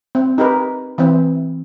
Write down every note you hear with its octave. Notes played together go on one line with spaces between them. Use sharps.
C4
D#4 G4 A#4 B4
E3 C4